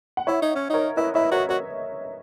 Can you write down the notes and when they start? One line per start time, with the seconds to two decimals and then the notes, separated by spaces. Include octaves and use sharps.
0.17 F#5
0.27 E4 C#5 E5
0.42 D#4
0.55 C#4
0.70 D#4 A#4 C#5
0.97 E4 B4 D#5
1.14 E4 C#5 E5
1.31 F#4 A#4 C#5
1.49 F#4 A#4 C#5